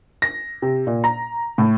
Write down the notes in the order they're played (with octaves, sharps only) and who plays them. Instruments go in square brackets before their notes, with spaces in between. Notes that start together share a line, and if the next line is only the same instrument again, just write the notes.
[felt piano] A#6
C3
A#2
A#5
A2